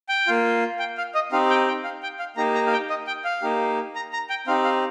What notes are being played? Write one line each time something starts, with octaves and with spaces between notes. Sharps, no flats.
G5
A#3 F4
G5
F5
D#5
C4 D#4 G4 F5
G5
G5
F5
G5
F5
A#3 D#4 G4 A#5
A#5
F5
G5
D#5
G5
F5
A#3 D#4 G4
A#5
A#5
G5
C4 D#4 G4 F5
F5